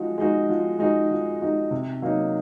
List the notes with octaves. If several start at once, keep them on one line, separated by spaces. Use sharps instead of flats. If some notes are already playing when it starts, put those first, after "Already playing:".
Already playing: F3 G#3 D#4 F#4
G#3 D#4 F#4
F3
G#3 D#4 F#4
F3
G#3 D#4 F#4
C3
F#3 A#3 D#4